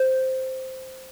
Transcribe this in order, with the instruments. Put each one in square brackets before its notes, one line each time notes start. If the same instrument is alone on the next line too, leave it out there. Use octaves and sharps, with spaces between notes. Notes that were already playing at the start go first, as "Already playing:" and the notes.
Already playing: [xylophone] C5